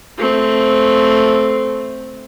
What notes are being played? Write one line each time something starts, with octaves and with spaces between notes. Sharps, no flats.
A3 C4